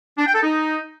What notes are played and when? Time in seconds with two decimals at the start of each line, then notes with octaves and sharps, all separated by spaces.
0.17 D4
0.26 G5
0.34 A4
0.42 D#4